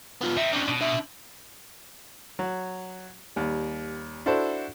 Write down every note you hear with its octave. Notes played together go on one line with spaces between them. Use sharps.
B3 F4
C4 D#4 E5
C#4 D4
B2
D4 E5
F#3
D#2 G3
D4 E4 F#4 A4 C5